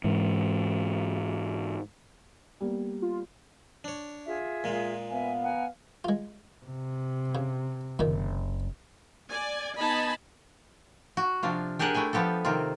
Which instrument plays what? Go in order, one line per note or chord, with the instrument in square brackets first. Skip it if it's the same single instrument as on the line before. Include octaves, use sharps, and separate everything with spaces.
[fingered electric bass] G#2 E3
[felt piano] G3 A#3 B3
[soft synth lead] F4
[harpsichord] D4 C#5
[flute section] F4 G#4 E5
[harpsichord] A#2 G#3
[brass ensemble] B3 F5 [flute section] E5 G#5
[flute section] F#5 G#5 A#5
[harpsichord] G#3 F4
[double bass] C3
[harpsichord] C#3
[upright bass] F#1 [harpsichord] A#2 D#3
[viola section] D5 G#5
B3 D#4 D#5 G#5 A5 B5
[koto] F#4
C3 F3 D4 F4
D4 G4 G#4 A#4 F#5
A3 E4 G5 G#5
F3 B3 G4 A4
C3 D#3 C4 F4